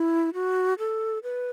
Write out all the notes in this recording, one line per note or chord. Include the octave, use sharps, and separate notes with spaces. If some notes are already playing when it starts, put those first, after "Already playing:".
Already playing: E4
F#4
A4
B4